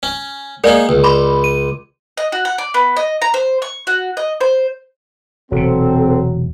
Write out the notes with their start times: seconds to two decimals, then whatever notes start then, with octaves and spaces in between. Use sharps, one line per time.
0.03 C#4
0.64 G#3 A#3 G#4 A#4 D5
0.89 C#2
1.04 B5 C6 D6
1.44 D#7
2.17 D#5
2.32 F#4
2.45 F#5
2.58 D5
2.74 B3
2.97 D#5
3.22 A#5
3.34 C5
3.62 C#6
3.87 F#4
4.17 D#5
4.41 C5
5.52 E1 C3 F#3 C4 A4